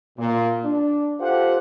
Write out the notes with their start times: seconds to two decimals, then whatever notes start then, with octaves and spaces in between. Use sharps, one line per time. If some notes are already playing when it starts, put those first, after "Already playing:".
0.18 A#2
0.64 D4
1.20 F4 G4 A4 C5 F5 F#5